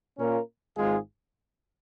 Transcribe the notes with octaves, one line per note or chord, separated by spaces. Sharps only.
A#2 A#3 C#4 F4 A#4
G#1 G#2 G#3 F4 G#4